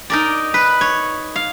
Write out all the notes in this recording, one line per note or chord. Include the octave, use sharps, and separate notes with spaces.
D#4 A#4 D5
B4
C#5
F5